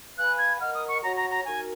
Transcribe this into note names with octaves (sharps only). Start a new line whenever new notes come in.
B4 F5 G#5 B5 F#6
G#6
A#4 D#5 F#5 F6
D#6
C#6
F#4 C#5 F#5 A#5 C#6
A#5
A#5
D#4 F#4 A#4 G#5